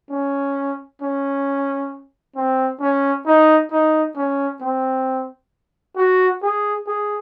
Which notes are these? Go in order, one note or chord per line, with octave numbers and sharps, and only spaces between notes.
C#4
C#4
C4
C#4
D#4
D#4
C#4
C4
F#4
G#4
G#4